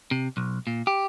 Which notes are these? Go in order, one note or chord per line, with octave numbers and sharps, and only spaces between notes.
C3
B1
A#2
G4